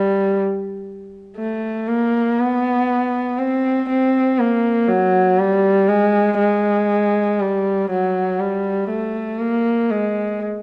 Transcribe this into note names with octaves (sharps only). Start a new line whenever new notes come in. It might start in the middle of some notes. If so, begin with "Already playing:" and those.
Already playing: G3
A3
A#3
B3
C4
C4
A#3
F#3
G3
G#3
G#3
G3
F#3
G3
A3
A#3
G#3